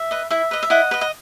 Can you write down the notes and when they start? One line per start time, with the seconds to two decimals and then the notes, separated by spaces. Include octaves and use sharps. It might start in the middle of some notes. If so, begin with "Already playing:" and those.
Already playing: E5
0.11 B4 D#5
0.30 E4 E5
0.51 B4 D#5
0.63 E5
0.70 E4 D#5 F#5
0.91 B4 D#5
1.01 D#5